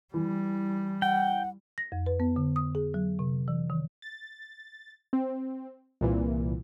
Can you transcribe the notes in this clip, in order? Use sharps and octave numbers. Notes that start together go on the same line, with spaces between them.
E3 G3
F#5 G5
A#6
F2
B4
B3
D3
D#6
G#4
F#3
C3
E3
D#3
A6
C4
C2 A#2 E3